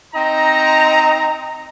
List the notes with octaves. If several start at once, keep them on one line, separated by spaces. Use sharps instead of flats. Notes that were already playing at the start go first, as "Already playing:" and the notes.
C4 D#4 D#5 A#5